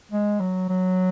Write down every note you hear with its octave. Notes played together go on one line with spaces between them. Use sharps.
G#3
F#3
F#3